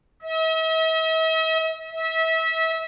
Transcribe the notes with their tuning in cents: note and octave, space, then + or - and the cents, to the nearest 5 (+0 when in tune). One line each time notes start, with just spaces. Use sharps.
E5 -45
E5 -30